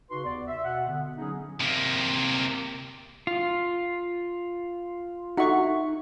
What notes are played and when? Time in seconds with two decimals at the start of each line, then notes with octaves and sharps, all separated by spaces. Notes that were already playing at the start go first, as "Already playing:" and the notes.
0.10 C#3 D#4 F#4 B4 C6
0.24 D#2 B3 D5
0.47 E5
0.64 B2 F#5
0.87 D3 B3
1.18 F#3 B3 C#4 D#4 G#4
1.61 C3 A#3
3.27 F4
5.37 D#4 F#4 A4 E5 F#5 C#6